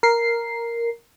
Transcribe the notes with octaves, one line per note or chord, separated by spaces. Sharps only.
A#4 C7